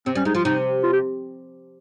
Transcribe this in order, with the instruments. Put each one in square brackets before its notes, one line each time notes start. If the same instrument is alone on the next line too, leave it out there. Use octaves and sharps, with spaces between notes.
[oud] C3 [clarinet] C4
[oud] G3 [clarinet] C#4
[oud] G#3 [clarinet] D#4
[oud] F3 [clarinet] F4
[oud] C3 [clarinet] D#4
[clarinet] F4
G4